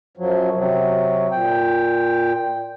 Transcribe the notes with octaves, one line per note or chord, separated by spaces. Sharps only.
F#2 F3 F#3
C3 F#3
A#2 G5